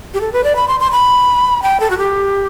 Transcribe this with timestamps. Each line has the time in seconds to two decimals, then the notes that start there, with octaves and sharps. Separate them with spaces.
0.14 G4
0.21 A4
0.33 B4
0.44 D5
0.56 B5
0.68 C6
0.80 C6
0.91 B5
1.62 G5
1.80 A4
1.90 F#4
1.98 G4